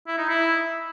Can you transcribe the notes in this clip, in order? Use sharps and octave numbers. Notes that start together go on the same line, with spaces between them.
E4
D#4
E4